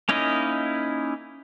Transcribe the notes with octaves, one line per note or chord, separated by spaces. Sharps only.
A#3 C#4 D#4 E4 D#5